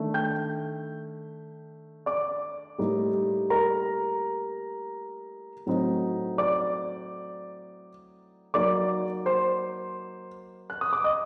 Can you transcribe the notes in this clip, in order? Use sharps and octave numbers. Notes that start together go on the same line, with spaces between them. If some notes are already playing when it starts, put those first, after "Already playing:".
Already playing: D#3 A3 D4
G5 G6
D5 D6
A2 G3 A#3 D#4
A#4 A#5
A2 F#3 C4 D#4
D5 D6
F#3 A#3 D#4 D5 D6
C5 C6
F#6
D#6
D6
D#5 D#6